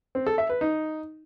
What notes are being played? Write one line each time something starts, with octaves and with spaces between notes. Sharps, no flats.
C4
A4
E5
B4
D#4